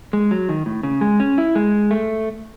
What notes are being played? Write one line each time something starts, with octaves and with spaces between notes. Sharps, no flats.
G#3
F#3
D#3
A2
C#3
G#3
C#4
E4
G#3
A3